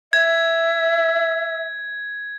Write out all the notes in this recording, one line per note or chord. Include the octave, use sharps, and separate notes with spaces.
E5 G#6